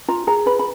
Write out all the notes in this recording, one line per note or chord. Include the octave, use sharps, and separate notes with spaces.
F4 A#5
G#4 A#5
B4 B5
B5